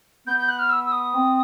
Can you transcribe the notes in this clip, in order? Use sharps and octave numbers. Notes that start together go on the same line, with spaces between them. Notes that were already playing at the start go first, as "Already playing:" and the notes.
B3 G6
G6
F#6
F6
E6
E6
D#6
C4